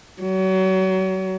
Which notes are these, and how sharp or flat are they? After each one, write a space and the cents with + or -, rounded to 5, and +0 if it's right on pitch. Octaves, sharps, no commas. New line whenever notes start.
F#3 +35